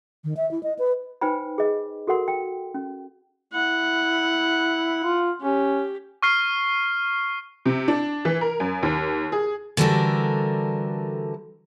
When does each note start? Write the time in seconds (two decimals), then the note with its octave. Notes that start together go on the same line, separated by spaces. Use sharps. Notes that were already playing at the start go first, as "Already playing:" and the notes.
0.24 D#3
0.37 E5
0.51 E4
0.63 D#5
0.79 B4
1.21 D#4 B4 C5 G5 G#5 B5
1.58 G#4 D#5
2.07 F#4 A4 A#4 F#5 C6
2.28 G5
2.74 C#4
3.54 E4 F#5
5.04 F4
5.42 C#4 G4
6.22 C#6 F6 C7
7.66 C3
7.88 D4
8.25 E3
8.41 A#4
8.60 F#2
8.83 D#2
9.32 G#4
9.77 D3 E3 G3 F#4 A4 A#4